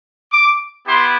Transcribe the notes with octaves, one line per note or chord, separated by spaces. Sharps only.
D6
B3 E4 G4 C6